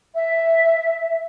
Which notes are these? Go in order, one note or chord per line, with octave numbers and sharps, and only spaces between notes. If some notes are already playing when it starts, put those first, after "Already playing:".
E5